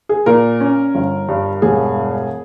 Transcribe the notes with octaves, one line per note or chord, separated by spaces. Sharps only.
G#4
A#2 A#4
C#4
G1
G2
E1 G#4